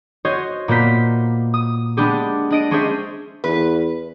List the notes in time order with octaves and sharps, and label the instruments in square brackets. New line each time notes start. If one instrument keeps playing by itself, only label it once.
[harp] F#4 C5 C#5 D#5
A#2 A#3 B3 C5 B6
D#6
G#3 B3 D4 G4 G#4
D4 D#5 D7
G#3 C#4 D4 G#4 C5 E5
[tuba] E2 [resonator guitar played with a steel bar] B4